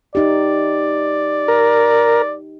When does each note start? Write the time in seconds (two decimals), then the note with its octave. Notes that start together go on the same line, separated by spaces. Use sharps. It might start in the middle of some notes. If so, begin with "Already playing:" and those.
0.15 D#4 G4 D5
1.48 A#4